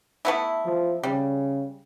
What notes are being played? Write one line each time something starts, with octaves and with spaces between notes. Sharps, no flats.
A3 B3 E4
F3
C#3 G3